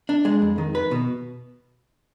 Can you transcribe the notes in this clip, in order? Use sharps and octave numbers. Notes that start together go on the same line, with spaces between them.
D4
G#3
F2
D#3
B4
B2